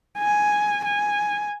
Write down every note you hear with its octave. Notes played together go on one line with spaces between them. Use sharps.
G#5
G#5